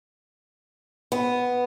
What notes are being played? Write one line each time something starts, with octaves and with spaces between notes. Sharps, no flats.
B3